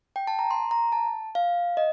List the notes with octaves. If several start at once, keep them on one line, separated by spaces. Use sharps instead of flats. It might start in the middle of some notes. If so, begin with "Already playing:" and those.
G5
A5
A#5
C6
A#5
A5
F5
D#5